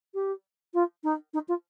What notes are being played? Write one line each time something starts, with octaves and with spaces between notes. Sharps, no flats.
G4
F4
D#4
D#4
F4